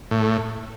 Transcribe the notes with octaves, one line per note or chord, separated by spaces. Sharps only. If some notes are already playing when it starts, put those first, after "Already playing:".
A2